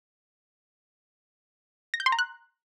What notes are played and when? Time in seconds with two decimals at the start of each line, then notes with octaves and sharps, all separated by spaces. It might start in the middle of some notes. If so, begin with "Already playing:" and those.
1.94 A#6
2.00 G6
2.06 C6
2.12 A#5
2.19 F#6